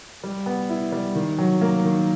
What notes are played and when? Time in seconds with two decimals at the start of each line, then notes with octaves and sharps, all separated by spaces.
0.24 G3
0.46 B3
0.69 E4
0.92 G3
1.15 D#3
1.38 F#3
1.61 A#3
1.84 D#3